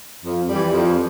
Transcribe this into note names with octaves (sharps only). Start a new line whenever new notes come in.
F2
E3 G3
F2